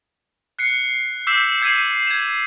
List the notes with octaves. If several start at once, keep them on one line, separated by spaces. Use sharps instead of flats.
F#6 C7 C#7
D6 E6 G6 B6 C7 E7
E6 G#6 B6 C7 D#7 E7
G#6 E7